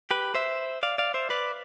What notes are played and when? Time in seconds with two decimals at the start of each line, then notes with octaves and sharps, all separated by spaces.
0.11 G4 B4
0.35 C5 E5
0.83 D5 F5
0.98 D5 F5
1.14 C5 E5
1.30 B4 D5